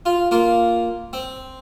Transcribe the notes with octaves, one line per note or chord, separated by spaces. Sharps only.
F4
A#3 F4
C4